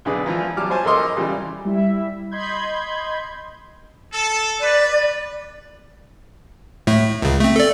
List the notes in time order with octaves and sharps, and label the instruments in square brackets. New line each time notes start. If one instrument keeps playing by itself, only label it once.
[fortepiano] B1 D3 G#4 B4 D5
A#2 E3 F3
F#3 G3 A5 D6 F6
C5 C#5 G#5 A5
A#1 A4 A#4 D#5 C6 D6
A#2 C#3 E3 G3
[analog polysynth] G3 E4 E5
D#5 B5 C6 G6 G#6
[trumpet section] A4
[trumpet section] B4 [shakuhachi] D5
[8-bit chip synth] A2 A3
C#2 C#3
A3 C4
A4 D5